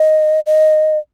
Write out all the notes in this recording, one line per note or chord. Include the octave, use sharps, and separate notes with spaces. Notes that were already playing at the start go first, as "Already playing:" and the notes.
Already playing: D#5
D#5